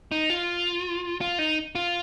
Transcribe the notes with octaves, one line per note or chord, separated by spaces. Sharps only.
D#4
F4
F4
D#4
F4